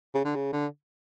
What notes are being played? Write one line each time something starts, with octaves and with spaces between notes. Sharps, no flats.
C#3
D3
C#3
D3